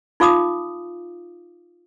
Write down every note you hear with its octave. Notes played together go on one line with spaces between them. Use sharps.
D#4 F4 F5 D6 D#6